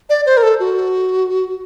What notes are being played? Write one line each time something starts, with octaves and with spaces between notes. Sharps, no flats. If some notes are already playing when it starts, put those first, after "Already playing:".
D5
C5
A#4
A4
F#4